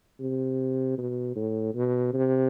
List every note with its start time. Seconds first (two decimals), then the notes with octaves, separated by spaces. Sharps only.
0.20 C3
0.98 B2
1.36 A2
1.74 B2
2.13 C3